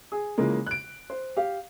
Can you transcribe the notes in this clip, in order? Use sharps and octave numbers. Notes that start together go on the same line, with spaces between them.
G#4
C#3 E3 F3 G#3 A#3
F#6 D7
C5
G4 F5